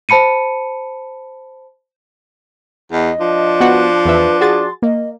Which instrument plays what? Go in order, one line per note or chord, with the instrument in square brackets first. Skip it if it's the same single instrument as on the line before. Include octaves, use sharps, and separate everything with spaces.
[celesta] C5 A5 B5 C#7 D#7
[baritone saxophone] E2 [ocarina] D#5
[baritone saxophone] F3 [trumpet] D4
[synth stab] B3 F#4 F#5
[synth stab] E2 E5 [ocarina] B4
[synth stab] F#4 G#4 A6 [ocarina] C6
[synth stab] A#3 [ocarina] D#5